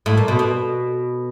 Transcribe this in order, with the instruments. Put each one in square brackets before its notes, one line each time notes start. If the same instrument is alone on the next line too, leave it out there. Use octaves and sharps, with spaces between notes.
[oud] A2
A#2
B2
B2